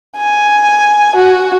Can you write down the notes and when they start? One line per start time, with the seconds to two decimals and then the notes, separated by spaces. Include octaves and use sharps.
0.18 G#5
1.16 F#4